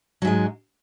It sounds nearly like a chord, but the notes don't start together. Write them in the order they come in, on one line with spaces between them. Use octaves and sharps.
F#3 G#2 G#3